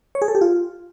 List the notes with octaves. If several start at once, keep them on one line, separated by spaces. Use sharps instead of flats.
C#5
G#4
A4
G4
F4